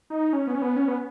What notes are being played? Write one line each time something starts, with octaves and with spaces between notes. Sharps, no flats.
D#4
C#4
B3
C#4
B3
C#4
B3